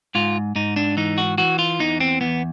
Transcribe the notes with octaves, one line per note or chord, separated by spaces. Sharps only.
G#2 F4
G#2 D#4
D4
E3 D#4
F#4
E3 F#4
F4
E2 D#4
C4
E2 B3